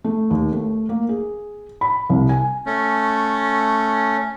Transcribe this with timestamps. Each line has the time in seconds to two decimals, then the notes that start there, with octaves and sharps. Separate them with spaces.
0.04 A3
0.30 D#2
0.52 A3
0.89 A#3
1.09 G#4
1.81 B5
2.10 C2
2.29 G#5
2.66 A3 C#4